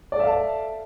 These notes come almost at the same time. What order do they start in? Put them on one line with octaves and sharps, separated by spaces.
D5 A4 E5 F5 A5